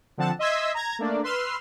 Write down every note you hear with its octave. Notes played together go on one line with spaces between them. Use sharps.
D3 F3 C4 F#5 A5
D#5 E5 C6 E6 G#6 B6
A#5 G#6
A3 A#3 D4 D5
B4 C6 E6 F6